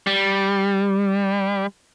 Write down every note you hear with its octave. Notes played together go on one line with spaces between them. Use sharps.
G3